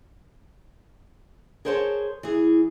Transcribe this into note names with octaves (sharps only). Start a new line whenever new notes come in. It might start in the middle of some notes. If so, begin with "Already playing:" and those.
G#4 A#4 C5 C#5 G5 A5
E3 G#4